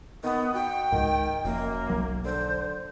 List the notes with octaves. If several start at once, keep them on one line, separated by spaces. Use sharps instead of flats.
D#3 B3
F#4 G5
C#2 G#2 D#3
F1 F#2 A#3
B1 F#3
D3 C5